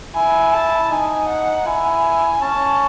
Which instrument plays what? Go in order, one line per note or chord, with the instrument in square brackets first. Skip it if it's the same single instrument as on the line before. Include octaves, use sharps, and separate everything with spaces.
[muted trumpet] E4 [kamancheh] G#5
[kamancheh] A5
[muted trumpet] D#4 [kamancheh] G#5
[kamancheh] F#5
[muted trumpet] E4 [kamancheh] G#5
[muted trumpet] C#4 [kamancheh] A5